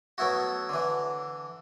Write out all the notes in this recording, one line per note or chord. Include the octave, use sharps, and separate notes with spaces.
F#3 A3 B3 E4 F#4
D3 E3